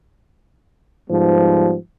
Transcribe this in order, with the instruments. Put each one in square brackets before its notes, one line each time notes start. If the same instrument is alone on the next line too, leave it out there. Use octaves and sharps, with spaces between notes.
[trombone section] G#2 F3 G3 B3